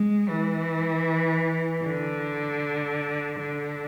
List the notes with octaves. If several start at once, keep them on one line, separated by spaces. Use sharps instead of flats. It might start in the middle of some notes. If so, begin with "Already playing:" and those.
Already playing: G#3
E3
D3
D3